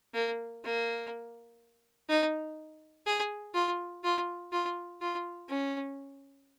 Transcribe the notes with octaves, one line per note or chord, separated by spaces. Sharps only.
A#3
A#3
D#4
G#4
F4
F4
F4
F4
C#4